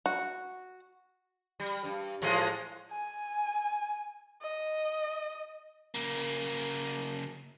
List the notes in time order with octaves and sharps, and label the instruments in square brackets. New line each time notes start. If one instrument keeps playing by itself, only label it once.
[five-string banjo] F#4
[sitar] G3
G2
A2 F3 G#3
[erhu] G#5
D#5
[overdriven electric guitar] C#3 A#3